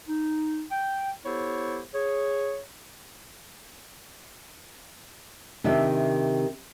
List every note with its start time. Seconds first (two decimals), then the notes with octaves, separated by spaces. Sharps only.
0.08 D#4
0.71 G5
1.26 B3 E4 G4 A4 C5 C#5
1.94 G#4 C#5
5.64 C3 D#3 D4 E5